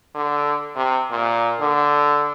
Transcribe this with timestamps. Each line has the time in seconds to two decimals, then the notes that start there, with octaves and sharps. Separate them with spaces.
0.15 D3
0.76 C3
1.11 A#2
1.60 D3